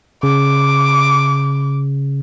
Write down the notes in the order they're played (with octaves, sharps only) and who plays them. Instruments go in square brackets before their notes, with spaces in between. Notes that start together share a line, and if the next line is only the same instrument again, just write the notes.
[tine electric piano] C#3 [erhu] D6